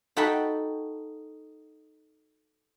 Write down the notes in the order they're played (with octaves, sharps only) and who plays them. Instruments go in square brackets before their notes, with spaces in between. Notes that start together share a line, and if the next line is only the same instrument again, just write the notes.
[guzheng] D#4 F#4 A4 G5 A5 B5